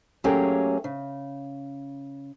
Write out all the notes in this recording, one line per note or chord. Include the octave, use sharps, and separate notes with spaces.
F#3 A3 A#3 C#4 G4 G#4
C#3